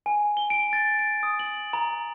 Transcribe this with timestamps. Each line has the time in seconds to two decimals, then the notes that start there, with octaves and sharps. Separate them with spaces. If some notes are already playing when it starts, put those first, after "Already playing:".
0.06 G#5
0.37 G7
0.50 D7
0.73 A6
0.99 D7
1.23 D#6
1.39 F#7
1.73 A#5